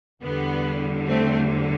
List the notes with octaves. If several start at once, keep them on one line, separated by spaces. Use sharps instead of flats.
E2 D3 G3 B3
A3 C4